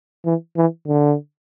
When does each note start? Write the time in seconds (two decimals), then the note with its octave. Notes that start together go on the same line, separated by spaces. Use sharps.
0.25 E3
0.57 E3
0.87 D3